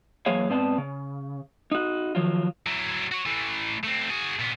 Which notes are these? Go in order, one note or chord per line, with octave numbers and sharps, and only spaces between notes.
E2 F#3 A#3 G#4 C#5 F5
G#2 B3 C4 D5 A5
C#3
D#4 F#4
D#3 F3 F#3 F4
F#3 E4
F#4 C#5
E3 A3
A3 C4
F#4 G#4
A#2 B3